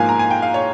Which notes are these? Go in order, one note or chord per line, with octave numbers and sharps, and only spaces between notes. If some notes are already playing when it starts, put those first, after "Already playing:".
Already playing: G#2 F3 A#3 F5 G#5
A#5
G#5
G5
F5
C#5